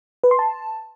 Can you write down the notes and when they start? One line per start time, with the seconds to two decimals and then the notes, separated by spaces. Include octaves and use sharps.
0.24 B4
0.31 C6
0.39 A5